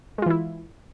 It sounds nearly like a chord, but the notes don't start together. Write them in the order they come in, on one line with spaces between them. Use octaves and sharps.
G#3 F4 E3 E4